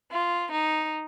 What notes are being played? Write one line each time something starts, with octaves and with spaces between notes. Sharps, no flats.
F4
D#4